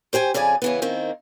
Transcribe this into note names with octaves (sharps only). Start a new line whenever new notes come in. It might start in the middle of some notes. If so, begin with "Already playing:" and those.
G4 C5 G5 G#5
F2 C#3 G#4 D5 G#5
C#3 E3 B3
D#3 A#3 C4